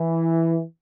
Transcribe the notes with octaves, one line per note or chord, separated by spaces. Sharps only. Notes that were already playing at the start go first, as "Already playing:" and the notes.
Already playing: E3